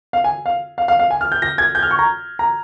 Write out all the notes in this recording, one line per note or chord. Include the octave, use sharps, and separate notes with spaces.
F5
G#5
F5
F5
F5
F5
G#5
F6
G6
A#6
G#6
G6
F6
C#6
A#5
A#5